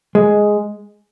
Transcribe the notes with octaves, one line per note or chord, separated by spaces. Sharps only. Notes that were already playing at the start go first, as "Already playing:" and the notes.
G#3